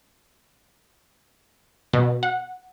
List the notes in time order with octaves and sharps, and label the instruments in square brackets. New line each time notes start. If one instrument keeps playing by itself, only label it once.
[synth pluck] B2
F#5